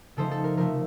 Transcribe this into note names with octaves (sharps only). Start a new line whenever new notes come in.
C#3 F3 A3 D#4 A4 C5
A4
A#4
C3 F3 A3 A#4